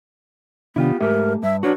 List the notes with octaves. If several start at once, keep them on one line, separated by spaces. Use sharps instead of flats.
C3 D#3 B3 D4 E4 F4 G4
G#2 A3 G4 A#4 E5
G2 E5
D4 F#4 B4 C#5 F#5